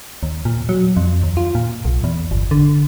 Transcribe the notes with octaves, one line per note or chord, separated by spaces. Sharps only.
D#2
A#2
F#3
F2
D#2
F4
A#2
B1
E2
G1
D3